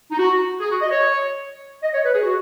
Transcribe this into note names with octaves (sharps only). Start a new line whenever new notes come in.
D#4
F#4
G#4
F#4
D#5
C#5
D#5
C#5
B4
G#4
F#4